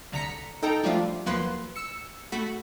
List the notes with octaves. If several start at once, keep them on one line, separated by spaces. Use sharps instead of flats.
C2 D3 A#5 B6 C#7
D#4 A4 G5 A#5
F3 G3 A3 D4 F4
D#2 F3 F#3 A#3 B4 C6
E6 C#7
A3 F#4 B5